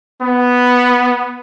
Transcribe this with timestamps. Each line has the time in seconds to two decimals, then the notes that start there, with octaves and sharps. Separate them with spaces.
0.22 B3